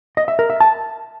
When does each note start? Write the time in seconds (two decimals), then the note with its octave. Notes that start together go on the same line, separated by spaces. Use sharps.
0.17 D#5
0.28 E5
0.39 A#4
0.50 E5
0.60 A5